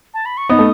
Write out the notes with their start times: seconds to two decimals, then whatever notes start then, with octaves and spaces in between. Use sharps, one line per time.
0.14 A5
0.25 B5
0.37 C#6
0.49 B3 D#4 D#6
0.59 A3